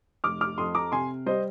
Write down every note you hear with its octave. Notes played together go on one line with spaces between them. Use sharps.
F1 D6 F6
D6 F6
F2 C6 D#6
A#5 D6
C3 G#5 C6
G3 C5 D#5